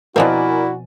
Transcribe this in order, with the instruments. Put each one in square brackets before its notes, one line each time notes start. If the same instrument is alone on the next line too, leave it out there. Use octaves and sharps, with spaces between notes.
[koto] B2 F3 C4 [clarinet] E4 [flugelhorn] F#4 [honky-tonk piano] A#4 D5 G#5